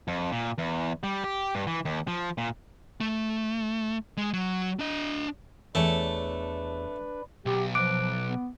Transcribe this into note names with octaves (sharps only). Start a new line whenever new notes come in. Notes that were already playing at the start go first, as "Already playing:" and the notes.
F2
A#2
E2
G3
G4
G2
E3
D#2
F3
A#2
A3
G#3
F#3
D4 D#5
E2 A3 D4 A4 B4 C#5
B1 G4
F3 D6 F#6 D7
B3